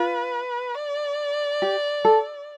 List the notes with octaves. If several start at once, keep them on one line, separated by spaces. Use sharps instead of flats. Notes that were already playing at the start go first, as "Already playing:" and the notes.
Already playing: F4 B4
D5
G4
A4